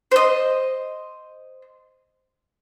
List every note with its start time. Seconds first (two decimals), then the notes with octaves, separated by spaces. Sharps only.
0.11 C5 D#5